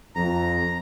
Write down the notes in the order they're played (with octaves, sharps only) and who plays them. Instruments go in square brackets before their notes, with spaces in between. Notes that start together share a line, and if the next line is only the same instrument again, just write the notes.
[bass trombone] F2 [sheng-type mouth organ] A#5